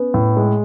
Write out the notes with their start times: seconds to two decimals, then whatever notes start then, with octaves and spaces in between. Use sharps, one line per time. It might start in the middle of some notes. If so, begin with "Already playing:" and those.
Already playing: B3 C#4
0.14 A2
0.37 G#3